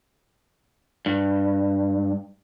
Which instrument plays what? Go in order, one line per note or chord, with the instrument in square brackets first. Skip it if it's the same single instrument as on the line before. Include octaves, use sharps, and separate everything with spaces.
[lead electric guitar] G2